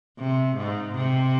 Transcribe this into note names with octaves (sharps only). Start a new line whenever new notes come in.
C3
G#2
C3